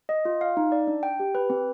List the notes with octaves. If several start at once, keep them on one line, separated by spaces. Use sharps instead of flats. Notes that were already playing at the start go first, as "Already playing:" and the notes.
D#5
F4
F5
D#4
D5
D4
G5
G4
B4
C4